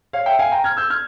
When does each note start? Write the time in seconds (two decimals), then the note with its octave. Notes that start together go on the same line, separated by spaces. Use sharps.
0.13 C#5 F5
0.26 E5 G5
0.39 F5 G#5
0.52 G5 A#5
0.64 F6 G#6
0.77 E6 G6
0.90 F6 G#6